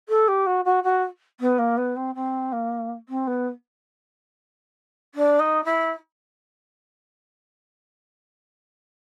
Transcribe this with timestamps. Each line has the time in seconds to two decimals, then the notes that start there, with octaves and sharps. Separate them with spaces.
0.09 A4
0.28 G4
0.46 F#4
0.65 F#4
0.84 F#4
1.40 B3
1.58 A#3
1.77 B3
1.96 C4
2.15 C4
2.52 A#3
3.09 C4
3.27 B3
5.15 D4
5.39 D#4
5.64 E4